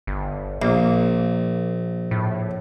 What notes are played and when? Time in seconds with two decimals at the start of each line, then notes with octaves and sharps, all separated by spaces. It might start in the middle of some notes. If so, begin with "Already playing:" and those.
0.07 G1
0.62 A#1 A#3
2.11 A2